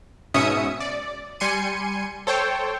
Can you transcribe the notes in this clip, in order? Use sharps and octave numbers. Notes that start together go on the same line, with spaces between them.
G#2 B2 C#4 E5 D#6 C#7
D5
G3 G#5 C6 C#7 D#7
A4 C5 C#5 G5